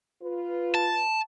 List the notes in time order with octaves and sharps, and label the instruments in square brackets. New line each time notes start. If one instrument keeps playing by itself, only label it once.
[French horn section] F4 B4
[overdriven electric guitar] A5